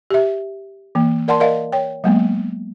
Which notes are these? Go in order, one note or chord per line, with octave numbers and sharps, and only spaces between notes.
G4 E5
E3 A#3
A#4 D5 F#5 A5 C6
A#4 D5 D#5 F5 F#5
C#5 G5
F#3 G#3 A#3 B3